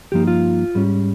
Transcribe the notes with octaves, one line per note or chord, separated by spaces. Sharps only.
G2 F3 A#3 D#4 G4
F4
G#2 G3 C#4